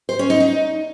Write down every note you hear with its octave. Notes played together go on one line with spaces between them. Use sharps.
C5
C#4
D#4
D#4